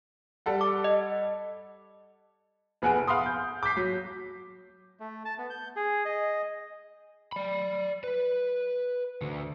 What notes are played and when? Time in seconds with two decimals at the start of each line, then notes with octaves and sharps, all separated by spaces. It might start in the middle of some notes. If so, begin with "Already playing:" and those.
0.46 G3 A4 F#5
0.61 D6
0.84 D#5
2.82 F1 B3 G#4 F#5 G#5 D7
3.07 F5 F#5 B5 C6 D#6
3.26 G6
3.63 D6 G6 B6 C7
3.77 F#3
5.00 A3
5.25 A5
5.38 B3
5.50 G6
5.76 G#4
6.05 D#5
7.32 D5 B5
8.04 B4
9.22 D2 D3